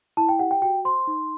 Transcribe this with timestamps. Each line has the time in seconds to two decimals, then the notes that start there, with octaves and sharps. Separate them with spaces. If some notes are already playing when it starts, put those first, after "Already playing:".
0.17 E4 A5
0.29 G5
0.39 G4 F#5
0.51 G5
0.62 F#4 G5
0.85 C5 C6
1.07 D#4